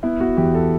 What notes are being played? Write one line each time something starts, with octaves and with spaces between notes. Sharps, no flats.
B3 E4
B3 F#4
E2 G4
A4